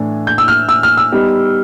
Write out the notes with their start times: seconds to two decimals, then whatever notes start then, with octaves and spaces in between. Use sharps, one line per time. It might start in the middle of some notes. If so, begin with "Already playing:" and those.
Already playing: A2 E3 A3 D4
0.27 G6
0.38 E6
0.48 F6
0.69 E6
0.83 F6
0.97 E6
1.12 G3 B3 D#4 G4